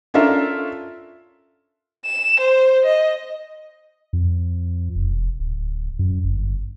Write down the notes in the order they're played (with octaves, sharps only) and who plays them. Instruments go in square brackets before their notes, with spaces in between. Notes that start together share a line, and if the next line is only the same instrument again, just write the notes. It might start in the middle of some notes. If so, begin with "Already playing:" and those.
[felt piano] C#4 D4 F4 A4 A#4 E5
[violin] E7
C5
D#5
[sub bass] F2
E1
D1
F#2
G1